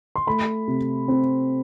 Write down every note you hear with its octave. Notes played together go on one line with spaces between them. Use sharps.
C6
A3 B5
C3
C4